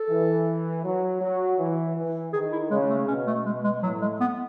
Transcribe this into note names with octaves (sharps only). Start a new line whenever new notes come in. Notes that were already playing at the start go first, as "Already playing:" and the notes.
Already playing: A4
E3
F#3
F#3
E3
E3
D#3 G#4
E4
C#3 G#3
A3
B2 C#4
A3
G#3
G#3
A2 F#3
G#3
B3